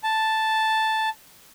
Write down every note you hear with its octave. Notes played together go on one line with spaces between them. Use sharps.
A5